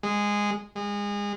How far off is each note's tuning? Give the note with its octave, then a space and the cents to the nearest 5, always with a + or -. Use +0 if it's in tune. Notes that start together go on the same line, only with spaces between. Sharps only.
G#3 -15
G#3 -30